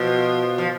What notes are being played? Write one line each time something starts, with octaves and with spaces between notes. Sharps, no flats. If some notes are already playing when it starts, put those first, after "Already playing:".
Already playing: B2 F3
F3